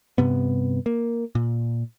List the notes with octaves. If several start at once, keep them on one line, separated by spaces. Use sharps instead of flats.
G2 C3 B3
A#3
A#2